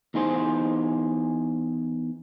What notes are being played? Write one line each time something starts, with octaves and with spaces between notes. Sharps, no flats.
E2 D#4 G#4 C5